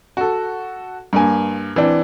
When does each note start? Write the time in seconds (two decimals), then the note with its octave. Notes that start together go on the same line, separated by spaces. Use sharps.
0.17 F#4 A4
1.13 G2 A#3 G#5
1.76 E3 C4 D4